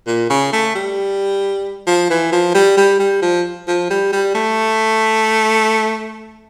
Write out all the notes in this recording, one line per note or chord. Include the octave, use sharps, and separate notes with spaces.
A#2
C#3
A3
G3
F3
E3
F3
G3
G3
G3
F3
F3
G3
G3
A3